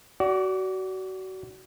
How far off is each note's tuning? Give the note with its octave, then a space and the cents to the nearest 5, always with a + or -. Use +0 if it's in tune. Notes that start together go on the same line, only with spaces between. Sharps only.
F#4 +25 D5 -20